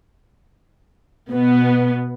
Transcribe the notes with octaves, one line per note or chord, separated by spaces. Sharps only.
B2 B3